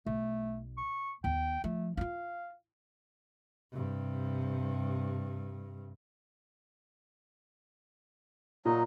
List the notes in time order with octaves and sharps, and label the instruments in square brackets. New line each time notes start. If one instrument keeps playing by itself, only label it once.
[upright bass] B1 [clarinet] A3
[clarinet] C#6
[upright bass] D#2 B3 [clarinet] G5
[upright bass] F3 [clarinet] A3
[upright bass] D4 F4 [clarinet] F5
[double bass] G2 C3
[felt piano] A#2 [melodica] F#3 D#4 D#5